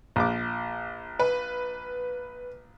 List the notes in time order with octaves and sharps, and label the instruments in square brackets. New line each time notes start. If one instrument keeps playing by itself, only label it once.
[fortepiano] A#1 D6
[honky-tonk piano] B4